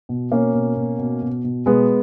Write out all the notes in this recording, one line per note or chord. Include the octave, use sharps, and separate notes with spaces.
B2
B2 A#3 C#4
B2
B2
B2
B2
B2
B2 G#3 B3